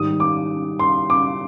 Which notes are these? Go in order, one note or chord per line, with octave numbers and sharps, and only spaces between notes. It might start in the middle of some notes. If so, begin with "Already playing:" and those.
Already playing: G#2 D#3 G3 D#6
D6
C6
D6